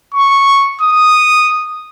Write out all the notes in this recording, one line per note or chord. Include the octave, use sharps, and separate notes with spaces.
C#6
D#6